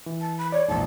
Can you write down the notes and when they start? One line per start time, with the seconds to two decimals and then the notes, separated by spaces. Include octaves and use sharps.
0.06 E3
0.21 A5
0.38 B5
0.52 C#5 D5 G#6
0.68 A#1 E2 G#2 A5